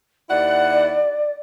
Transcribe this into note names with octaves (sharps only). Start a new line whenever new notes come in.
D#2 E4 D5 F#5